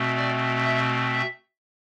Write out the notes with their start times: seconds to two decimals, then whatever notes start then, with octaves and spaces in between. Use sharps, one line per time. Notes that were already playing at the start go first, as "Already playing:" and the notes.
Already playing: B2 A3 C4
0.17 D5
0.65 E5
1.13 E5